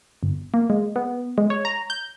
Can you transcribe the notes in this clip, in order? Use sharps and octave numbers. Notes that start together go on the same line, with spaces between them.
G1
A#3
G#3
B3
G#3
C#5
A#5
G6